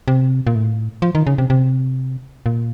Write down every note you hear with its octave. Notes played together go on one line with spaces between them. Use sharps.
C3
A#2
A2
F3
D#3
C#3
C3
C3
A#2